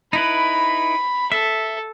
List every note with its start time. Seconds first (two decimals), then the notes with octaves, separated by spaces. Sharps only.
0.13 D#4 E4 B4 B5
1.32 A4 E5